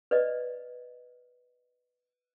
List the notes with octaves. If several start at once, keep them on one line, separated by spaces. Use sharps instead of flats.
B4 D5 D#5